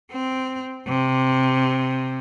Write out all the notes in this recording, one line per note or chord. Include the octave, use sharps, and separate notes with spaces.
C4
C3